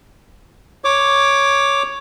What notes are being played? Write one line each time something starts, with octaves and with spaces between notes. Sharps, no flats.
C#5 D6